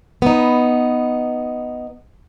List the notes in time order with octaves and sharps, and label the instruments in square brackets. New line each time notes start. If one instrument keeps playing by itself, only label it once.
[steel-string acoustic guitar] B3 D#4